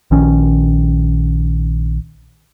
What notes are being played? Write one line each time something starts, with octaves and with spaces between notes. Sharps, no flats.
A#1 D#3 C#4